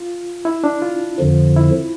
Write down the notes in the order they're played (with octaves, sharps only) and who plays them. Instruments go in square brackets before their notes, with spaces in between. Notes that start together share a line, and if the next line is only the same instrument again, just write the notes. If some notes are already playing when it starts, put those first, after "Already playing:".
Already playing: [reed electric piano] F4
E4
D4
F4
[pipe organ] F2 D3 F3
[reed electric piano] E4